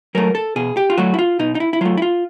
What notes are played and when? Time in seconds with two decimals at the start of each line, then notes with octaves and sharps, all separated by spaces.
0.15 F#3 A3 A#4
0.35 A4
0.56 B2 G#4
0.77 G4
0.90 F4
0.97 F#3 A3 F#4
1.14 E4
1.19 F4
1.39 B2 D#4
1.55 D#4
1.60 E4
1.73 E4
1.81 F#3 A3 F4
1.97 E4
2.02 F4